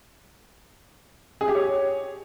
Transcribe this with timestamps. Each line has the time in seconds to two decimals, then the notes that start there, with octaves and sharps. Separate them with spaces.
1.41 G#4
1.48 G4
1.55 C#5